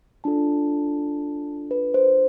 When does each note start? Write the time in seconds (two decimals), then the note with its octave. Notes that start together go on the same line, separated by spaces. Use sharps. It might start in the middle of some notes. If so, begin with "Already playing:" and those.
0.24 D4 F4 A4 A5
1.71 B4
1.94 C5